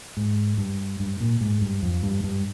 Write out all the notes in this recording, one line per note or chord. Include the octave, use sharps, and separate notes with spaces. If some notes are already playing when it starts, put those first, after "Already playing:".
G#2
G2
G2
A#2
G#2
G2
F2
G2
G2